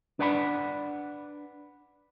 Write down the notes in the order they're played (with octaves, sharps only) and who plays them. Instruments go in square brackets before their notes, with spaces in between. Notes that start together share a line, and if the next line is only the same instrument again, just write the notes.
[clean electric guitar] D4 B4 D5 F#5 A#5 B5